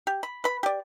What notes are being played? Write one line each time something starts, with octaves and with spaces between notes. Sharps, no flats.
G4
B5
B4 B5
G4 D5